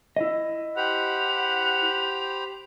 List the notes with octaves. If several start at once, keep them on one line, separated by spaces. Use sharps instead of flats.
E4 D#5
G4 C5 F#5 B5 F7